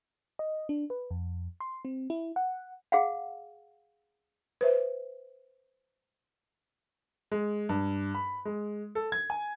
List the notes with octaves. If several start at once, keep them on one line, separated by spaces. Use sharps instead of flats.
D#5
D4
B4
F2
C6
C4
E4
F#5
G#4 F5 F#5
B4 C5 E5
G#3
G2
B5
G#3
A4
G#6
G#5